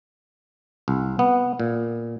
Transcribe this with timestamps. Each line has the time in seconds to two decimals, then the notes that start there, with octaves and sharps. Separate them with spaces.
0.88 C2
1.19 B3
1.60 A#2